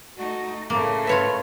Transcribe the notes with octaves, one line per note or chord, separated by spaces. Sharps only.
A3 D#4 F#4
A2 C#3 A3 A#3
F4 B4 C#5 E5